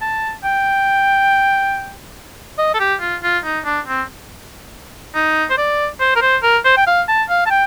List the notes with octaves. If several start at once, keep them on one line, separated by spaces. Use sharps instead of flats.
A5
G5
D#5
A4
G4
F4
F4
D#4
D4
C4
D#4
C5
D5
C5
A#4
C5
A#4
C5
G5
F5
A5
F5
A5
G5